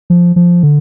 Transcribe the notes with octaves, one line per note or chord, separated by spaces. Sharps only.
F3
F3
D3